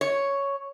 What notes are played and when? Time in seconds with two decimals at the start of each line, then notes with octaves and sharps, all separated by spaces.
0.01 C#5